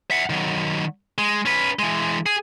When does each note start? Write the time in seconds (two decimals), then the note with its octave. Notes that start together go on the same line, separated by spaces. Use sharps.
0.11 E5 F#5
0.30 D#3 F#3
1.18 G#3
1.46 C#4 B4
1.79 E3 G#3
2.26 G#4